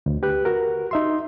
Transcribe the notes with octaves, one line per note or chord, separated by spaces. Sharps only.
D2
G4 B4 F#6
F#4 A#4
D#4 E5 C6